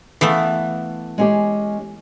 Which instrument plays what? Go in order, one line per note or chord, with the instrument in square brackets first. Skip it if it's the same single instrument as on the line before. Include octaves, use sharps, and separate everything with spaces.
[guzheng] E3 A3 B3 [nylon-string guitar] F5
[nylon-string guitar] G#3 C#4 G4